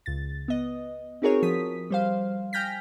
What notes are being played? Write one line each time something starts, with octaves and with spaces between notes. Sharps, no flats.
C#2 A6
B3 D#5
C4 D#4 F#4 G#4 A#4 C#5
F3 D#6 B6
G3 C5 F5
G5 G#5 F6 G6 A#6 B6